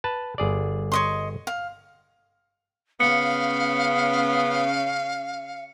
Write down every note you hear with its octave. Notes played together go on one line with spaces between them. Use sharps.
B4 A5
G1 G#4 D5
C#5 D#5 C6
F5
C#3 B3 C#4 F5 C#7